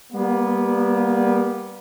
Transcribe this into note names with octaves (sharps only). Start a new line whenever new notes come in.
G3 A#3 B3